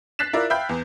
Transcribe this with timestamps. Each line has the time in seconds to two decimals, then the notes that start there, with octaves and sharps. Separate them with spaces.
0.19 F#6 A6 B6 C7 E7
0.33 E4 F4 A#4 D5
0.50 E5 F5 G5 B5 G6
0.69 E2